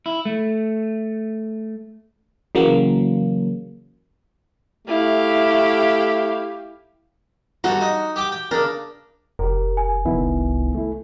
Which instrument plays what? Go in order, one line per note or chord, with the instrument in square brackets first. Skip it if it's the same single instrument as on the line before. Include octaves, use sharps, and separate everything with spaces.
[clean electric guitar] E4
A3
[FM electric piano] C#3 E3 F#3 A#3
[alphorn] A3 [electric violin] E4 F5 [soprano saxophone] G4
[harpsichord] G2 A4 A#5 [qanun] F#4
[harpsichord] D#4
G4 G5 D6
G5
[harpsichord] C#3 A#4 [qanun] D4
[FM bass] F1 [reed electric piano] G4 A#4
[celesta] G#5
[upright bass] C2 [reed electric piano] D#3 B3 E4
[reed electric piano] A3 E4